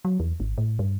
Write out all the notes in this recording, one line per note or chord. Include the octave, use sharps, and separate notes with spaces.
F#3
E2
G#1
A2
G2